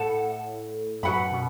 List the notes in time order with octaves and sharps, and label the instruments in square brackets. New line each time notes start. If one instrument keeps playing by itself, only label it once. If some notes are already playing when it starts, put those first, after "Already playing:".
Already playing: [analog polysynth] A2 [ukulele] A4 F#5 A5
[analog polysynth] F#2 [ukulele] F#4 B4 F#5 B5
[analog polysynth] B2